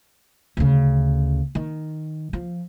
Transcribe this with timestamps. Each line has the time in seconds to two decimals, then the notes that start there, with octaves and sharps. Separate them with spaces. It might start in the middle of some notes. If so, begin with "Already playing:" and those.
0.57 D2 C#3
1.55 D#3
2.33 F3